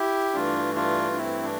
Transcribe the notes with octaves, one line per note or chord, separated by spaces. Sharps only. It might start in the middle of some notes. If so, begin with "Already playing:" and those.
Already playing: E4 G4
G2 E3 A3 D4 F4
D4 F4
D4
C4 E4
D4